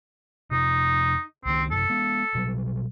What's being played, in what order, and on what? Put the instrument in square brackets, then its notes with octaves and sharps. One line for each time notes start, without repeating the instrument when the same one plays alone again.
[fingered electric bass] F2 C3 [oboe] D#4
[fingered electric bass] C#2 D#3 [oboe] C4
[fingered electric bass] F#2 C3 [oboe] A4
[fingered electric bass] G#3 B3
B2 F#3 G3